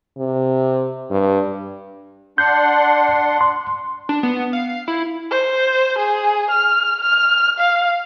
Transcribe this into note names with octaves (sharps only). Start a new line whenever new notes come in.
C3
G2
D4 F#5 C6 G6
C6
D4
B3
F5
E4
C5
G#4
F6
F6
F5